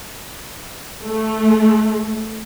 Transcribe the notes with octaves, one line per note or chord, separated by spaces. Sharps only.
A3